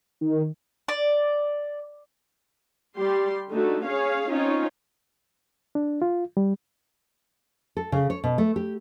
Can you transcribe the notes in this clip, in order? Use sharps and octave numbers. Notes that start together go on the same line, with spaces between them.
D#3
D5
G3 G4 C6
D3 A3 D#4 F#4
C#4 G#4 C#5 F5
C4 C#4 D#4 F4 C#5
D4
F4
G3
A4
C#3
C#5
B2
A3
G4